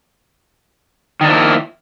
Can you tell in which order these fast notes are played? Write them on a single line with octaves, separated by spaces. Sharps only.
D#3 D4 F3 E4 A#3